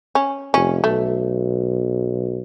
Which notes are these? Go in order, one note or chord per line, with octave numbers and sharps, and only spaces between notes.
C#4
F1 C#4
B1 A3